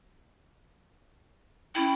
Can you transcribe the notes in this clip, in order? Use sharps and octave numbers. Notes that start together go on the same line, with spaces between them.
C#4 E4 G5